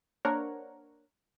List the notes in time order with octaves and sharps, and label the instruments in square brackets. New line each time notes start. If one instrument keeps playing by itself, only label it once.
[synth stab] A#3 D4 A#4 C5 C#5 F#5